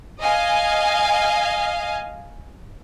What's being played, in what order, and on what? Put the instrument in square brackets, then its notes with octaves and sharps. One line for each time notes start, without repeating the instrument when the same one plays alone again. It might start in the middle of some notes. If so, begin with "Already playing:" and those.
[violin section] D#5 F5 G#5